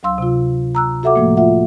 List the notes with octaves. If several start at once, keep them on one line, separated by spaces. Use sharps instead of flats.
D2 F#3 F5 C6 E6
C3 F4
A#5 E6 F#6
F#4 A4 E5 F#5 D6
A2 F3 A3 A#3
F4 E5 F#5